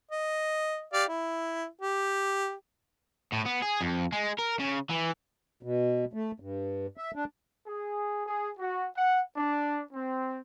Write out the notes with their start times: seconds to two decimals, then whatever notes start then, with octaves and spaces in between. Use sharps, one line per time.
0.11 D#5
0.93 G4 D5 F5
1.08 E4
1.81 G4
3.33 A2
3.46 B3
3.62 G#4
3.81 F2
4.12 G#3
4.39 A#4
4.60 C#3
4.90 E3
5.63 B2
6.13 A3
6.40 G2
6.97 E5
7.16 D4
7.66 G#4
8.26 G#4
8.58 F#4
8.95 F#5
9.36 D4
9.93 C4